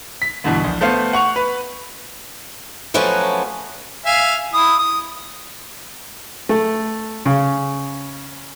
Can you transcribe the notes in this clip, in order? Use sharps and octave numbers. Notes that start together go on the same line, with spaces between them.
B6
D2 G2 B2 E3
A#1
A3 B3 C5 F5
F#5 C#6 F7
B4
F3 F#3 A3 C#4 B4
E5 F5 G#5
E4 D#6
D#6
A3
C#3